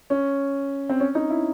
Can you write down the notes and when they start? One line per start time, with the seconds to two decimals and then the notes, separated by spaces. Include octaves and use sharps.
0.10 C#4
0.89 C4
1.00 C#4
1.15 D#4
1.30 E4